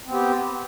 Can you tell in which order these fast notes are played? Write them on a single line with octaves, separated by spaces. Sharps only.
C4 B3 G4